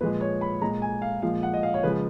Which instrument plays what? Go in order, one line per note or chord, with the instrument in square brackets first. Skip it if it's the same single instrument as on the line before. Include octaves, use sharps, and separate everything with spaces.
[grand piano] A#2 F3 G#3 B4
C#5
B5
A#2 G#3 A#5
G#5
F5
A#2 F3 G#3 F5
F#5
D#5
F5
C#5
C#3 F3 G#3 B4